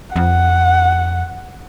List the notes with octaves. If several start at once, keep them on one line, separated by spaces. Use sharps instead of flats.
F2 F#5